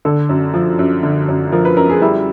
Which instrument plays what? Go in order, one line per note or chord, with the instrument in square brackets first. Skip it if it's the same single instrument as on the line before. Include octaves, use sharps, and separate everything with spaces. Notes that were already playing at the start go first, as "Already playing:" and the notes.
[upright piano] D3 A4
F#2
F3
F#2
D3
F#2
F3 A#4
B4
F#2 A#4
G#4
G3 E4